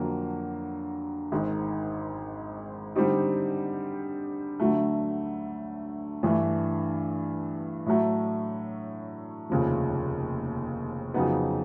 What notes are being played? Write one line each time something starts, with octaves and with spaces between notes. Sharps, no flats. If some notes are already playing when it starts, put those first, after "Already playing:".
Already playing: F2 D3 F#3 A#3
G#1 G#2 D#3
D3 G3 C4 D#4 G4
D2 D3 F#3 A3
G2 E3 A3
A2 F#3 A3
F1 D#2 C#3 F3
F2 C#3 F#3 B3 D#4